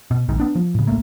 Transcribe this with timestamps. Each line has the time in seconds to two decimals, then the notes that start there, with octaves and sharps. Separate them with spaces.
0.11 B2
0.28 A#1 G#2 D#3
0.40 B3 D4
0.55 F3
0.75 A2 C#3
0.87 D1 A1 A3 A#3